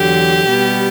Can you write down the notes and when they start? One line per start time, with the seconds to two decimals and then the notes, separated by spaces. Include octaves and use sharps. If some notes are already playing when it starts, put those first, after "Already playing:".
Already playing: E2 D3 F#3 G4
0.49 B2 G3 B3